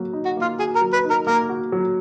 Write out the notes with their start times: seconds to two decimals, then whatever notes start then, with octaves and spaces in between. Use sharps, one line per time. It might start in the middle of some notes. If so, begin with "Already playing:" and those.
Already playing: F#3 A#3 F#4
0.13 D#4
0.25 F#4
0.37 A#3 F4
0.59 F#4 G#4
0.75 A#4
0.81 F#3
0.93 B4
1.04 D#4
1.10 A#4
1.27 A#3 A#4
1.49 F#4
1.72 F#3